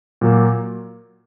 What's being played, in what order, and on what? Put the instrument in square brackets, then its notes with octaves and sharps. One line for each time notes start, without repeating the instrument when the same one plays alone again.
[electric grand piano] A#2 F#3 A#3